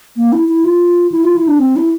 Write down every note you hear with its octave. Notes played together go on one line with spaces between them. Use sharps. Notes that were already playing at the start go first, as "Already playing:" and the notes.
A#3
E4
E4
F4
E4
F4
E4
D4
C4
E4